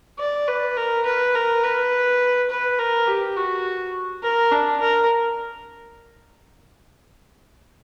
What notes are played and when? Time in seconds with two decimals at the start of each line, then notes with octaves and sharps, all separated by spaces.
0.19 D5
0.48 B4
0.77 A#4
1.06 B4
1.35 A#4
1.63 B4
2.50 B4
2.79 A#4
3.07 G4
3.37 F#4
4.23 A#4
4.52 D4
4.81 A#4